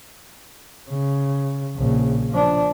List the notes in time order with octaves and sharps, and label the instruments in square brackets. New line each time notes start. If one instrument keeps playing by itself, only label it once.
[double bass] C#3
A#1 C#3
F3 D4